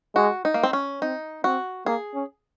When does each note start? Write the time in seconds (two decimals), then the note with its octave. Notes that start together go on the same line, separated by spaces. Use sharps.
0.15 G#3 F#4
0.45 D#4
0.54 A#3
0.63 C4
0.73 C#4
1.01 C4 D#4
1.44 C4 F#4
1.86 A#3 G#4
2.15 C#4